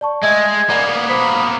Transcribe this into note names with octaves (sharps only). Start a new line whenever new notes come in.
D5 A5 C#6
G#3 D#5 E5 G#5 E6
G#5
A#3 B3 D5 F#5 G7
C5 B5 D#6